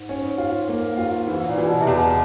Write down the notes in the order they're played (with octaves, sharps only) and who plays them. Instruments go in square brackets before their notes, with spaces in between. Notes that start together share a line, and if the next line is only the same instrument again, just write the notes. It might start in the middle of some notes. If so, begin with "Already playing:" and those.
Already playing: [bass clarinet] G#2
[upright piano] C#4
F4
A#3
F4
[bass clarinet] G#2 [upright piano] E3
[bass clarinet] A#2
[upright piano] E3
[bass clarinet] B2
C3
[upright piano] E2 [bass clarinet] B2